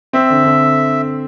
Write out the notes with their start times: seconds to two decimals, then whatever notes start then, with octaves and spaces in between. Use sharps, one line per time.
0.13 C4 E5
0.30 D3
0.44 D3